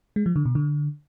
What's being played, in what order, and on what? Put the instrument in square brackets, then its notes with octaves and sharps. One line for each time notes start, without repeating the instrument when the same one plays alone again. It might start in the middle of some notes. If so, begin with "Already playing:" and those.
[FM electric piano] G#3
F3
D3
B2
D3